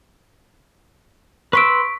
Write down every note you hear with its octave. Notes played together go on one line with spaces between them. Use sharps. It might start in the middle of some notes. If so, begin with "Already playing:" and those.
B4 C6 C#6 E6 B6 D7